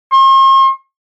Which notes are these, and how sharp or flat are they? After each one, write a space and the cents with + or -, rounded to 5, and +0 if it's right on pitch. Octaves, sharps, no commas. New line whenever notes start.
C6 +45